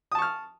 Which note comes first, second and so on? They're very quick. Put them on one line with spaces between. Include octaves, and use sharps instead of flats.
D#6 A5 C#6 F6